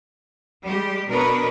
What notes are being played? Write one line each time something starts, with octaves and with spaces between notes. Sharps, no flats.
G3 G#3 G4
B2 D4 A#4 B4 C#5 D#5